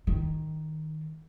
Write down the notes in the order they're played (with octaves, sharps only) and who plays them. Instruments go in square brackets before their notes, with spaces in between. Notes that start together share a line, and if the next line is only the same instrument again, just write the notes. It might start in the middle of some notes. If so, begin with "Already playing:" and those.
[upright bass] D#3